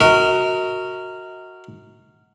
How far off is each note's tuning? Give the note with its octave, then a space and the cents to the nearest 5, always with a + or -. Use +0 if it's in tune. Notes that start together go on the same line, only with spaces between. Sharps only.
F#4 +0 A#4 -15 D#5 +40